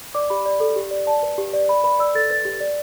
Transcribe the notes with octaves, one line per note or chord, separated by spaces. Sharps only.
D5 D6
G4 B5
D5
A4
G4
D5
D5 A5
B4
G4
D5
D5 B5
B4 B5
D5 E6
A4 A6
B4 A6
G4
D5